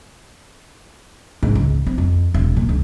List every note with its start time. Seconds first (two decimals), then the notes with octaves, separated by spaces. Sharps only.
1.42 G#2
1.55 C#2
1.86 C4
1.98 F2
2.34 E1
2.57 A#2
2.69 C#2